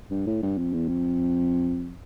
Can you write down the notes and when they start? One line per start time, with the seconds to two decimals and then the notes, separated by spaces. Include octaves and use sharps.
0.11 G2
0.27 A2
0.42 G2
0.58 F2
0.73 E2
0.88 F2